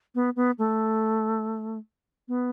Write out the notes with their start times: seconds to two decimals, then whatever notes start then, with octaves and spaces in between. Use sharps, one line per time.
0.15 B3
0.36 B3
0.58 A3
2.28 B3